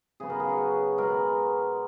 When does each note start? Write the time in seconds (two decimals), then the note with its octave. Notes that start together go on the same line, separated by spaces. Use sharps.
0.20 C#3 F#3 B3 G#4
0.30 A#4
0.40 G#4
0.49 F#4
0.98 B2 G#3 B3 A#4